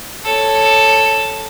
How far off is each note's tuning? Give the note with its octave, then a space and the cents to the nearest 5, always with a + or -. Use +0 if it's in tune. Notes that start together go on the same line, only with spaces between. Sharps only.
A4 +0 C#5 +0